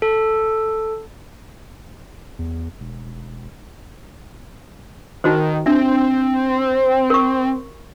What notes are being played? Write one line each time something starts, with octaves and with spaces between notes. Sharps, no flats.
A4
E2
E1
D#3 D#4 F#4 C5
C4 D4 E5
A#4 C#6